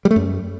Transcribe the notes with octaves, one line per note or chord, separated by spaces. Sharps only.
G3
A3
F#2